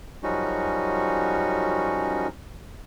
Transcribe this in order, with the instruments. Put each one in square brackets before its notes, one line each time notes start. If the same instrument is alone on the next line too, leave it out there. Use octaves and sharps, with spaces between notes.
[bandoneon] F#2 F3 G3 C#4 D#4 F#4